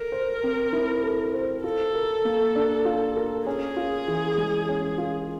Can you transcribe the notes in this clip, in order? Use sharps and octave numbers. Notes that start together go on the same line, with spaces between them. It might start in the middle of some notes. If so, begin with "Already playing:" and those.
Already playing: A4 A#4
C5
C4
E4
A4
C5
F4 A4
A#4
A#3
D4
F4
A#4
C#4 G#4
F4
E3
G#3
C#4
F4